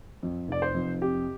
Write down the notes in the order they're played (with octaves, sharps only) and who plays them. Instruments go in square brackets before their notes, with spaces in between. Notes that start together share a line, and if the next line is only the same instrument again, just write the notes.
[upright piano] F2
[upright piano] F1 [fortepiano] D5
[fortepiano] C5
[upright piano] F2
[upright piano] C3 [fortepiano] G4